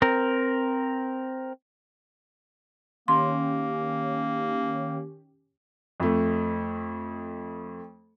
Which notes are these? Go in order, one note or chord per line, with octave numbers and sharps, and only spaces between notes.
C4 A#4
D#3 A#3 C#4 G4 C6
F2 A3